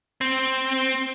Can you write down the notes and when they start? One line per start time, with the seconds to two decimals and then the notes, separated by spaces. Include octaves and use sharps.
0.21 C4